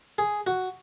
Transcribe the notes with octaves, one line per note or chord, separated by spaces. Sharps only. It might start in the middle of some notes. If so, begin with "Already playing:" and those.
G#4
F#4